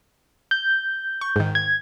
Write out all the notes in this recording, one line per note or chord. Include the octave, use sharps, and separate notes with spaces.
G6
C#6
G#2 D#3
G#6